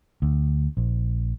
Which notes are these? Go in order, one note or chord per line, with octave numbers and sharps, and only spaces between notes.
D2
A#1